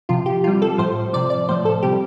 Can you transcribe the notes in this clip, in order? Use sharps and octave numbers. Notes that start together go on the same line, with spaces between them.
C3 F3 F4
G4
C3 G3 F4
A4
A2 F3 C5
C3 F3 D5
D5
A2 F3 C5
A4
C3 G3 G4